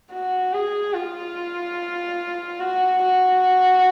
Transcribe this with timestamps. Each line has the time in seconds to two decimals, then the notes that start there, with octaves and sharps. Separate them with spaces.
0.11 F#4
0.53 G#4
0.94 F4
2.60 F#4
3.02 F#4